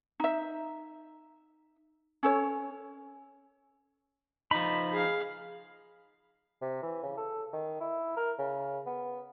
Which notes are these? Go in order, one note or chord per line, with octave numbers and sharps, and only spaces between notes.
D#4 E5
C#4 A4 C#5
F3 D#4 B5
G#4 F5
C3
E3
C#3
A4
D#3
E4
A#4
C#3
B3